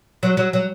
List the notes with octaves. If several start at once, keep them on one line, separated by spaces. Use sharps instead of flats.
F#3
F#3
F#3